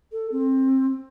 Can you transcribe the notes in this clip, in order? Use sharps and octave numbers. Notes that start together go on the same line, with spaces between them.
A4
C4